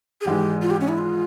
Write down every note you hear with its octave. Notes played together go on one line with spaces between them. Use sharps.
G#4
G#1 G#2 E3 G#3 G4
F4
G4
C#4
E4
F4